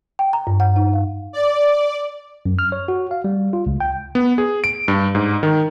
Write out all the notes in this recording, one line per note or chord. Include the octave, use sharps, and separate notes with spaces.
G5
A#5
G2
F#5
D#4
F5
D5
F#2
F6
C#5
F#4
F5
G3
F4
C#2
G5
B3
G#4
D7
G2
G#2
D#3